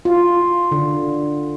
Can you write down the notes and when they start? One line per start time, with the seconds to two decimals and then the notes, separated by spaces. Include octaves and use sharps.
0.05 F4
0.72 D3